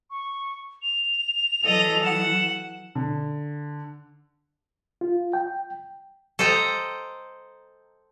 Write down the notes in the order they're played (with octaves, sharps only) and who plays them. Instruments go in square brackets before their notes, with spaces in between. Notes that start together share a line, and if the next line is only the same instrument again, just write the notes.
[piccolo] C#6
F7
[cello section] E3 F#3 [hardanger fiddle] A4 D#5
[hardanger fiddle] F#5 [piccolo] E7
[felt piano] D3
[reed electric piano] F4
G5
[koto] A4 C5 D#5 G5 A#5